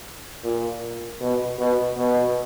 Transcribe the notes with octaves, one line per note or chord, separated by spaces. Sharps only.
A#2
B2
B2
B2